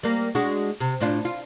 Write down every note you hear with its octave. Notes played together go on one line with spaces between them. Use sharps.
G3 A#3
G#3 D4 F#4
C3
A2 D4 F4
F4